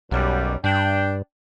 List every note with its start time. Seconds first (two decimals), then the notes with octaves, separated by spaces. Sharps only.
0.11 B1 F#2 G3
0.64 G2 D4 G5